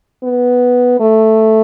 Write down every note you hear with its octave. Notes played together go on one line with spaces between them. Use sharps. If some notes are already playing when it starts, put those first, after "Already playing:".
B3
A3